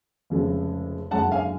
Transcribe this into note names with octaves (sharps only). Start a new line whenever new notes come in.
F1 F2 C#3 G#3
F#1 F#2 D3 G#3 F#5 A5
F5 G#5